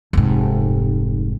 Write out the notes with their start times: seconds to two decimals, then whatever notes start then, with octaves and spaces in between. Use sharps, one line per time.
0.13 F1 G#2